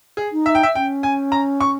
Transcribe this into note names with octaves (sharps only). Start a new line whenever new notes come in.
G#4
D#4
E5
G5
E5
C#4 G5
G#5
A#5
C#6